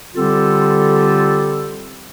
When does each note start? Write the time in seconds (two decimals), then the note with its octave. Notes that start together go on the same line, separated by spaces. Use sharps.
0.15 D3 G3 C4 F4 G4 A4